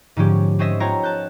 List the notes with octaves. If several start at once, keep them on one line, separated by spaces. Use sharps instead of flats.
G#2 D3 F3 C#4 G4
C4 C#4 C5 D#5 E5
B3 F4 C#5 G5 A#5
A5 F#6 G6